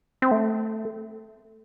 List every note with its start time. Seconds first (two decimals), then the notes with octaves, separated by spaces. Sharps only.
0.22 C4
0.31 A3